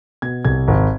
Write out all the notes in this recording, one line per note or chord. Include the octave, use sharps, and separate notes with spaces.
B2 G#6
C2 G#6
G#1